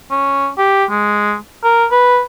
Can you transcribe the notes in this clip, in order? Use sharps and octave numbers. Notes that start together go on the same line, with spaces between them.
C#4
G4
G#3
A#4
B4